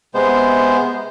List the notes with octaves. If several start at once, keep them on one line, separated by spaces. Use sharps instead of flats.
C3 G#3 B3 C5